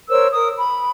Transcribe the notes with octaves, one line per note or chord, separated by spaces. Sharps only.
A#4 C5 C#5 E6
A#4 D#6
B5